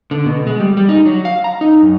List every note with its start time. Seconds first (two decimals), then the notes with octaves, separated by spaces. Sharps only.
0.11 D3
0.26 B2
0.47 G#3
0.60 G3
0.77 G3
0.89 D#4
1.05 F#3
1.25 F5
1.44 A#5
1.61 D#4
1.82 F#2